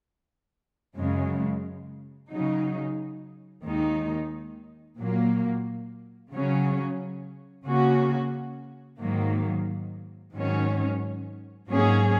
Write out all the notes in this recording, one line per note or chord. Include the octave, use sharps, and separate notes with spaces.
F#2 C#3 G#3
C#3 F#3 D#4
D#2 D#3 G#3 D#4
A#2 F#3 A#3
C#3 F#3 C#4
C#3 A#3 C#4 F#4
G#2 D#3 F#3 A#3
G#2 D#3 F#3 C#4
G#2 F#3 A#3 C#4 G#4